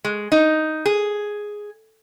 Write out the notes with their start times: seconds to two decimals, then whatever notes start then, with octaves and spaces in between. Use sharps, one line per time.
0.04 G#3
0.32 D#4
0.86 G#4